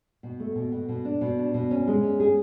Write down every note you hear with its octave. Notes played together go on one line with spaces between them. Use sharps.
B2
A3
B2
B2
B2
D4
B2
D4
B2
C#4
G#3
C#4
G#4